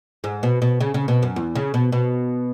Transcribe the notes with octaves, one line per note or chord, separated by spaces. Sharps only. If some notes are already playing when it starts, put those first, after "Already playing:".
G#2
B2
B2
C#3
C#3
B2
F#2
E2
C#3
B2
B2